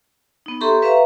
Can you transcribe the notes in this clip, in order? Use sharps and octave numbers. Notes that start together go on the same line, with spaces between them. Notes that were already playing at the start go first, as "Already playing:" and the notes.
B3 D#4
G4 A4 E5 A#5 C6 C#6
B4 E5 F5 A#5 C#6